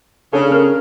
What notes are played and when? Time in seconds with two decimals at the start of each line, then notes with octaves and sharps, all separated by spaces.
0.33 C#3 D4 A4
0.51 C#4 A#4 F6